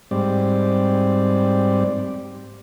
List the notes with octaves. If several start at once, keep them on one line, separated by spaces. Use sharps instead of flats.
G#2 G3 C4 D5